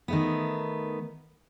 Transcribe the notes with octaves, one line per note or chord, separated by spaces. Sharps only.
D#3 A3 B3